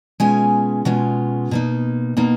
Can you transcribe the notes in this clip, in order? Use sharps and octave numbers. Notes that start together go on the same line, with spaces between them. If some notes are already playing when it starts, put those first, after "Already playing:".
B2 G#3 C#4 F4 G#5
B2 G#3 C#4 F4
B2 A#3 D#4
B2 A#3 D#4